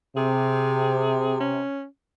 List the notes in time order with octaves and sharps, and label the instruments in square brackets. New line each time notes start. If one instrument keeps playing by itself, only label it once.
[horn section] C3 [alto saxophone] G#4
[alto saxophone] C#4